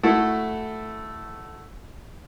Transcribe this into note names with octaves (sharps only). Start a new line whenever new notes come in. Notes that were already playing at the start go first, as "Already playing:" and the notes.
A3 E4 F#4 A4